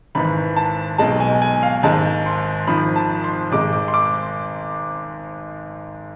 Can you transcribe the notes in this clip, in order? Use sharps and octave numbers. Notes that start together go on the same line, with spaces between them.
G#1 G#2 E3 B5
A5
B1 B2 G#3 A5
G#5
G#5
F5
G#1 G#2 G#3 A5
C6
G#1 G#2 F3 B5
A5
C6
G#1 G#2 G#3 D6
D6
C6
D6